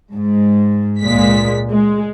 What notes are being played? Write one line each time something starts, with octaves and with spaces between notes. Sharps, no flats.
G#2
C#2 A#2 G#3 B6
G#3